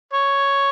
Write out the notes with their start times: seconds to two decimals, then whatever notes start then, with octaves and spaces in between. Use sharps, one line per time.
0.13 C#5